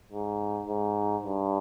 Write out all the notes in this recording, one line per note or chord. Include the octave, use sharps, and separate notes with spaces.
G#2
G#2
G2